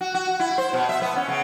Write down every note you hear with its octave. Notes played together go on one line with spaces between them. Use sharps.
F#4
F#4
E4
C5
B2
E5
B3
C#4
C#3